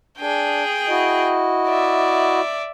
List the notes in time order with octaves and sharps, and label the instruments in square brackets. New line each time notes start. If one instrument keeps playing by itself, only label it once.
[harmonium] D4 [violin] G#4 G5
[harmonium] E4 F#4 D#5
[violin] D5 E5